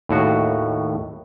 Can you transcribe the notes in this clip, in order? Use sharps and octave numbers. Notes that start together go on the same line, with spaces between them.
D#2 A2 F#4